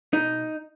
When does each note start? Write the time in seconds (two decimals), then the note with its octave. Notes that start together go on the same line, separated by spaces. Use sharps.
0.13 B2 D#4